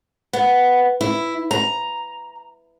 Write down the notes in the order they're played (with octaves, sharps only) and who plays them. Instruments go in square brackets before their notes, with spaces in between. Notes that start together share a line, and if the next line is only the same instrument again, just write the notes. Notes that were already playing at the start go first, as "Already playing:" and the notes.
[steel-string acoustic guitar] B3
E4
A#5